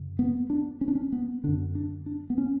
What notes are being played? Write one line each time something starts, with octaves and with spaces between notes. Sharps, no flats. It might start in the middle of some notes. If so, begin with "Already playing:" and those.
Already playing: F#2 C#3
B3
D4
C#4
D4
C#4
B3
F#2 D3 D4
D4
D4
B3
C#4